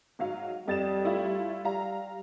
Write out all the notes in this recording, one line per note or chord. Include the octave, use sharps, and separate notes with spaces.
G#2 F#3 F5
F2 G3 A6 E7
A3 E4 F4
G3 F5 A#5